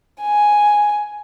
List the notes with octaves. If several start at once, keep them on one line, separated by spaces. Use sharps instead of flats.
G#5